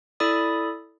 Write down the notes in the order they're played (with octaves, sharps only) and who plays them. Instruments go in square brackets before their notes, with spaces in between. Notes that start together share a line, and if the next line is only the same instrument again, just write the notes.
[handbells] E4 A4 D5 B5 D#6